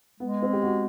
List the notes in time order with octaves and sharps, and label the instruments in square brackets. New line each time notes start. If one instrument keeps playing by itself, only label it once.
[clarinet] G#3 [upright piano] B3
[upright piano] C4
G4
F#4